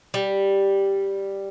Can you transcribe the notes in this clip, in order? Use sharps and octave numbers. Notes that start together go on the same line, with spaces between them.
G3